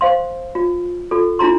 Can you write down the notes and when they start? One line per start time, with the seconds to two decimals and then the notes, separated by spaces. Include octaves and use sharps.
0.01 C5 F5 C6
0.55 F4
1.11 F4 A4
1.39 D4 E4 F4 A#5 C6